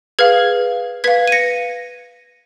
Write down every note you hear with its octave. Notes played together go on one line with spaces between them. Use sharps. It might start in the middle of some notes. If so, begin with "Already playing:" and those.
G#4 B4 F5 F6 G#6
B4 F5 G#6 B6
D#7
A#6 C#7